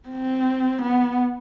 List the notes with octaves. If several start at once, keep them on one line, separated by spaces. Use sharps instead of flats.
C4
B3